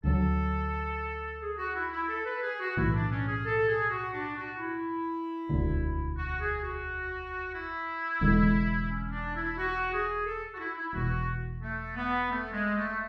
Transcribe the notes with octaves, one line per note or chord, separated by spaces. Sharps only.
D2 D3 F#3 A4
G#4
F#4
E4
E4
A4
B4
G#4
F#4
B1 A2 E3 A3 E4
D4
C#4
G#4
A4
G#4
F#4
D4
F#4
E4
E1 D2 D3
F#4
G#4
F#4
E4
E1 E2 D3 G#3
C#4
D4
E4
F#4
G#4
A4
F#4
E4
E4
E4
E1 E2 B2 F#4
A3
B3
A3
G#3
A3